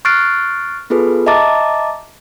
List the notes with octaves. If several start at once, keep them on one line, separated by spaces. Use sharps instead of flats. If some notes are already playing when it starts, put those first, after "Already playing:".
C#6 F6 F#6 A6 C7 D7
B3 F4 G#4 A4 B4
D#5 E5 A5 A#5 D6 A6